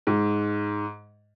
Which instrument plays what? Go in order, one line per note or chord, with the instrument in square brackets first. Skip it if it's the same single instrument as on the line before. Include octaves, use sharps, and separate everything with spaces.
[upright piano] G#2